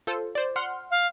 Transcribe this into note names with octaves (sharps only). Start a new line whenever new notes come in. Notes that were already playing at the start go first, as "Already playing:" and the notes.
F4 A4 C5
C5 D5
F#5 C6 F6
F5